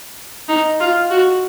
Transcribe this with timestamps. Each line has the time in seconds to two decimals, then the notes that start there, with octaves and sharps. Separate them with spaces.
0.48 D#4
0.80 F4
1.10 F#4